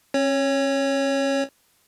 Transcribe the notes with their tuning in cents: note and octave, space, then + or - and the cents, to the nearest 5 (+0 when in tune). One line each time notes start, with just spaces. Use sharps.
C#4 -40 C#5 +0